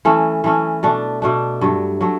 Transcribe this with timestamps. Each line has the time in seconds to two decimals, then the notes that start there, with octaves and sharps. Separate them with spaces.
0.05 E3 A3 C#4
0.44 E3 A3 C#4
0.83 B2 A3 D4
1.22 B2 A3 D4
1.61 G2 F#3 A3
2.01 F#3 A3